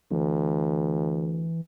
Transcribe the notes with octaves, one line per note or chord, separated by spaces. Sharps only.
D2 E3